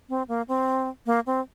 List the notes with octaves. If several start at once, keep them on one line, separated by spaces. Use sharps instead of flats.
C4
A#3
C4
A#3
C4